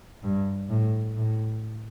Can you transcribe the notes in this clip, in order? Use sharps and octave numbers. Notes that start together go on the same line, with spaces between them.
G2
A2
A2